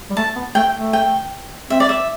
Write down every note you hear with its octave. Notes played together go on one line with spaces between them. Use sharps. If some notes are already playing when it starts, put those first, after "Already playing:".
G3
A3 A5
B3
A3 G5
A3
G5
C4 E5
D5
E5